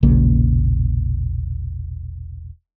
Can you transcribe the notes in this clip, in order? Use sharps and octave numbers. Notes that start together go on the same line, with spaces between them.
E1 A#1 C#3 A#3